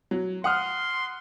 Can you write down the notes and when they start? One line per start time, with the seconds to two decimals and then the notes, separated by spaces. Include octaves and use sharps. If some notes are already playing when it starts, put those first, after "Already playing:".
0.11 F#3
0.44 F#5 C6 D#6 F6